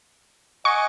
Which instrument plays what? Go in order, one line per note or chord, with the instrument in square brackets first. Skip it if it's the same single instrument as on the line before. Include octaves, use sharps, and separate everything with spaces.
[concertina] D#5 F#5 G#5 [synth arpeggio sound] C#6